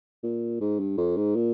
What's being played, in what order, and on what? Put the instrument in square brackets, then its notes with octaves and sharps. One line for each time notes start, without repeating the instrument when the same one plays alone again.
[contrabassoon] A#2
G#2
G2
F2
G#2
A#2